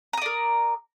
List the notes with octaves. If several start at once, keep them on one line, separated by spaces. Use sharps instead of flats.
A#4 D5 A#5 D#6